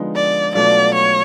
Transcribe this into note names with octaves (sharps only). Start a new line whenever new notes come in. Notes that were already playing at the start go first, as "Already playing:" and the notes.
Already playing: D3 F3 G#3 B3 D#4
D5
B2 F#3 A3 D4 F4 D5
C#5